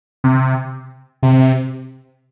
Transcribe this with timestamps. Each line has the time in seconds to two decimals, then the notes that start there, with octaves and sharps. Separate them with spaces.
0.24 C3
1.23 C3